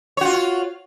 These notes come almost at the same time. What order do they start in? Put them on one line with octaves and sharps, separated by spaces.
C#5 F#4 F4